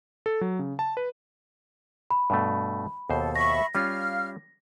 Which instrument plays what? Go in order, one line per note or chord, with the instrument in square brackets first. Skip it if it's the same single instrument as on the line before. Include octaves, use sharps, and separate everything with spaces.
[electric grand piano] A4
F#3
C#3
A5
B4
[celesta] B5
[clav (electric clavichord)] G2 B2 A3
[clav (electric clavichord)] D#2 B2 C5 [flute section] A4
[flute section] E5 B5 C#6 [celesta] A#6
[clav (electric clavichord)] G3 C#4 F4 [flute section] F5 F6